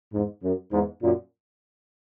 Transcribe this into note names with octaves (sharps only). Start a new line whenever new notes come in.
E2 G#2
F#2
E2 G#2
F#2 A#2